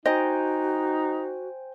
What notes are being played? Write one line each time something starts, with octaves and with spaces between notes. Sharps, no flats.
D#4 F#4 C5 D#5 G5 G#5